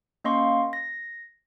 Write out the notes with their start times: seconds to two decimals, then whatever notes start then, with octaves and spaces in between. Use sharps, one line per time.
0.24 A#3 C#4 D#5 F5 C6 C#6
0.73 A#6